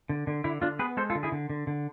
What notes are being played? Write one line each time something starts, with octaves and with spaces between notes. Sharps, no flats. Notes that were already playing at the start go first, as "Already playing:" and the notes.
D3
D3
D3 E4
D3 D4 F4
B3 G#4 B4
G#3 A4 C5
F4 A4
D3
E4 G#4
D3
D3
D3